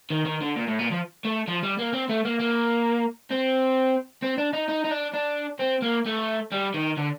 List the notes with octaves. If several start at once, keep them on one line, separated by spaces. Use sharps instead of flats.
D#3
D#3
D3
A#2
A2
A#2
F3
A3
F3
G3
A#3
C4
A3
A#3
A#3
C4
C4
D4
D#4
D#4
D#4
D4
D4
C4
A#3
A3
G3
D#3
D3